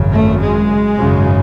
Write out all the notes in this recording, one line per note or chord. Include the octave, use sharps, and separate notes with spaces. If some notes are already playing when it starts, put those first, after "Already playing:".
Already playing: G#1 F#2 C#3
A3
G#3
G#1 F#2 C#3